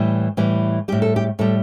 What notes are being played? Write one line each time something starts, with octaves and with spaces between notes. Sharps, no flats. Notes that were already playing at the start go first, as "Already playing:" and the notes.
Already playing: A2 E3 G3
A2 E3 G3
A2 G3 G4
A4
G4
A2 G3 A4